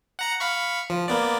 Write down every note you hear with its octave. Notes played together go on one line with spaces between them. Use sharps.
F#5 A#5 C#7
F5 B5 C#6
F3
A#3 B3 D5